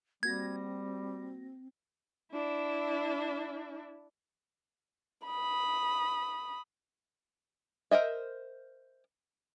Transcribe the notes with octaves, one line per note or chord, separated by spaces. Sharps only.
G3 A#3 C4 F#4 G#6 A#6
D4 E4
B5 D#6
A#4 C5 D#5 E5